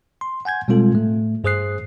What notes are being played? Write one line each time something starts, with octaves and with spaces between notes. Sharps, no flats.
C6
F#5 G#5 G6 G#6
B2 G3 G#3 C4 F4 A4
A2 A3
G2 G#4 C5 D#6 F#6 C7